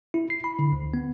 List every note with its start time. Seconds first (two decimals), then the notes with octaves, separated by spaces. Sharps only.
0.14 E4
0.30 C7
0.44 B5
0.59 D3
0.72 D2
0.94 B3